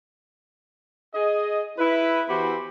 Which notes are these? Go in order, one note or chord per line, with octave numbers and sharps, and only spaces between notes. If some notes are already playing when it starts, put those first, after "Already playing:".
G#4 D#5
E4 B4
E3 B3 F#4 G4 C5 B5